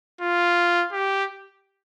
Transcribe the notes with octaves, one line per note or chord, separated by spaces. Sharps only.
F4
G4